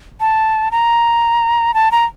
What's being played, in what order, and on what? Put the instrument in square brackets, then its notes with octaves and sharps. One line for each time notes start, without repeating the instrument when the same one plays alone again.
[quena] A5
A#5
A5
A#5